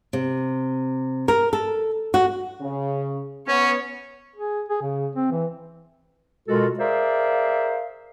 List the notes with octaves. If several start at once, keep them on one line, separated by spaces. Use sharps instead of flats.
C3
A#4
A4
F#4
C#3
B3 C#4 C#5
G#4
G#4
C#3
C4
E3
B2 G#3 F4 F#4 A4 A#4
G#4 A#4 C5 D5 E5 F5